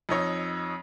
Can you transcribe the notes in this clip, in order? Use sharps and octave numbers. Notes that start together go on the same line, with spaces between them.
F2 D#4 C#5